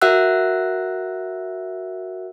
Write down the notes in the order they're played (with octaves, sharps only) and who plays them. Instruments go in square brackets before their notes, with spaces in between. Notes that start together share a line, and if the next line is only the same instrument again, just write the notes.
[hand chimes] F#4 A#4 E5 F#5 E6 F#6